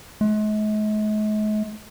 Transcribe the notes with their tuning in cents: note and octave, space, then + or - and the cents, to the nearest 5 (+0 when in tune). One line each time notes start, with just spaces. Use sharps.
G#3 +45